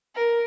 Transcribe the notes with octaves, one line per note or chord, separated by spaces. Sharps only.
A#4